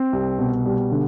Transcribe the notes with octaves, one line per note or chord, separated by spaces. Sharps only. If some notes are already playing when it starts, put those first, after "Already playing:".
Already playing: C4
C2
B2
G3
D3